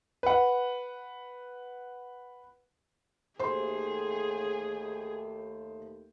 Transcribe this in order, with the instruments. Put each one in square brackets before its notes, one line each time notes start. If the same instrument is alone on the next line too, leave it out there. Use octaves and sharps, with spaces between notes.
[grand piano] B4 F#5
[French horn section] D#2 A3 [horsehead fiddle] G#4 [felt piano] C5 C6